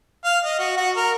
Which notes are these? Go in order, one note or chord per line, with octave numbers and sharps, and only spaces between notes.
F5
D#5
F#4
F#4
A#4